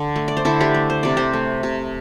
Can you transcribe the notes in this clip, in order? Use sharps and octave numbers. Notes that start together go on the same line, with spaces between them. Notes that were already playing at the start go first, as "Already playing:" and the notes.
Already playing: D3
A3
D5
C5
D3 E4 A4
D4 G4
A3
C5
C3 D5
G4 C5
A3
C3